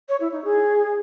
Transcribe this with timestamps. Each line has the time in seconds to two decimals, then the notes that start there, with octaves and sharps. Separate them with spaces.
0.08 C#5
0.20 E4
0.32 D#4
0.43 G#4